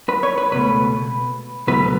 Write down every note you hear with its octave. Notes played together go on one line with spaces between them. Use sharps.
B4
C#5
B4
C#2 B2 A3 B4
C#2 B2 F#3 A3 B4